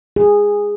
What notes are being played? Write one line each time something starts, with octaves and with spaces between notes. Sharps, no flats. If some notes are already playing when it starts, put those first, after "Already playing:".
G#4